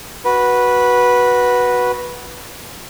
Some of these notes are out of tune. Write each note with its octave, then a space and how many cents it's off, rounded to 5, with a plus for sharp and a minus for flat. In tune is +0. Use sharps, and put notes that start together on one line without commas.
F#4 +0 B4 -10